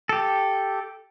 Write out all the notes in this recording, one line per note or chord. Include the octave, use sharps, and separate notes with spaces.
G4 A4